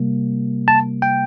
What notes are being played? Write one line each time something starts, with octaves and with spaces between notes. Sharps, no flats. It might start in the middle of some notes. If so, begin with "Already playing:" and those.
Already playing: C3 G3 A#3
A5
G5